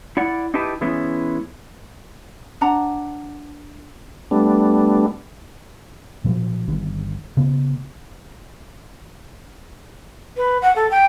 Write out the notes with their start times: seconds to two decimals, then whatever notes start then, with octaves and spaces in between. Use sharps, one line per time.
0.17 E4 D5 F#5
0.54 D#4 E4 G4 B4 A5
0.81 E3 G#3 B3 C#4 E4
2.61 D4 F#5 A#5
4.31 G3 A3 B3 D4
6.24 A#2 F3 F#3
6.68 G1 G2 D#3
7.37 C#3 A#3 B3
10.37 B4
10.62 F#5
10.76 A4
10.91 G5